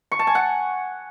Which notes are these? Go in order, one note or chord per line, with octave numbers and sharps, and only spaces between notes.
C#6
A5
G#5
F#5